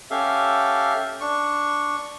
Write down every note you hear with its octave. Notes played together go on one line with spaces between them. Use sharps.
C#4 G4 A4 E5 F5
D4 C#6